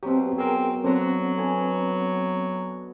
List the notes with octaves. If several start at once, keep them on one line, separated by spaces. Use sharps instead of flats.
B2 F#3 C4 G4
C4 G#4 A#4
D3 F#3 C4
D3 B3 G#5